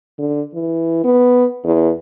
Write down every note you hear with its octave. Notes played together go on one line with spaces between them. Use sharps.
D3
E3
B3
E2